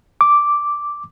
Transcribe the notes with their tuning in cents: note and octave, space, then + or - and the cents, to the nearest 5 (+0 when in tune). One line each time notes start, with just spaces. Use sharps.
D6 -5